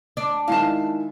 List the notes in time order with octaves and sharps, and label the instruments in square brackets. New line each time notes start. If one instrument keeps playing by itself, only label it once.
[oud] D4
[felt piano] D#3 G#3 E4 [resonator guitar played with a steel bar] F5 A5